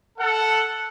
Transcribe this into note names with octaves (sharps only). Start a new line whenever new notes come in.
A4 F#5